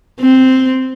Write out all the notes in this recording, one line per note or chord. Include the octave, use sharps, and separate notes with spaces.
C4